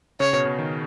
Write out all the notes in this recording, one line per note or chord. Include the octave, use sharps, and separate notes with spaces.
C#3 C#5
B2
B2
D#3